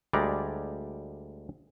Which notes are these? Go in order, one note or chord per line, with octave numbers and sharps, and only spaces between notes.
D2 G3 G#3 D5 A#5